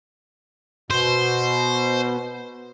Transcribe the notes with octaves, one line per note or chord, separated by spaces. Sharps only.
B2 C5